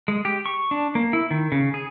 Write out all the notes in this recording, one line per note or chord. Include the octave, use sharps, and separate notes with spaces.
G#3
G4
C#6
D4
A#3
E4
D#3
C#3
G#4